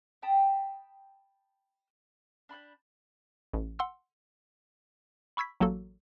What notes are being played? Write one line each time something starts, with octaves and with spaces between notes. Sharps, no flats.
G5 A5 B5 D#6
D4 B5 C6 G6
A1
F#5 C6 E6
B5 C#6 E6 G#6 B6
A1 F#3 A#3 F#4 A4